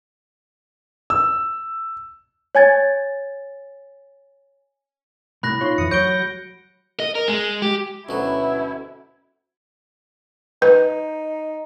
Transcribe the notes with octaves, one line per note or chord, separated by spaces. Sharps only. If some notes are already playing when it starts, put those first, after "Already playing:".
E6
C#5 G#5 G#6 A6
C2 A2 B5 F#6 A#6
D#4 F4 C#5 C6
F2 E3 D#6 C#7
F#3 C#5 G6 A#6 D7 G7
D#5
A#4
G#3
G4
D2 B2 F#3 C#4 E4
D#4 B4